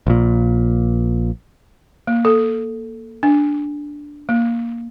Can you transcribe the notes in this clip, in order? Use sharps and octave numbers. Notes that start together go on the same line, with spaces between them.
A#1 A#2
A#3
A4
D4
A#3